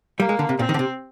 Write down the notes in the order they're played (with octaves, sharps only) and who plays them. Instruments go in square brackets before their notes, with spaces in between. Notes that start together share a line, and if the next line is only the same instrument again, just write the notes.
[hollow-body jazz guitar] G3 [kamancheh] A#3
[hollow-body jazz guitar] G#3
D3
C3
[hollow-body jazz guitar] A#2 [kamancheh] C4
[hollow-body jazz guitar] D#3
D3
C3